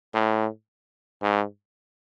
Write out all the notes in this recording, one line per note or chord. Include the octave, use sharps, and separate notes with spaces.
A2
G#2